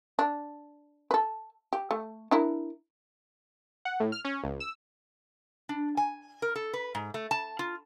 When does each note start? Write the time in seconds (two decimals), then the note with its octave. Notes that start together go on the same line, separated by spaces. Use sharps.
0.19 D4
1.11 A4 B4
1.73 G4
1.91 A3
2.31 D4 E4 A#4
3.85 F#5
4.00 A2
4.12 F6
4.25 C#4
4.44 C#2
4.60 E6
5.69 D4
5.97 G#5
6.42 A#4
6.55 A4
6.73 B4
6.95 G#2
7.14 A3
7.31 A5
7.59 F4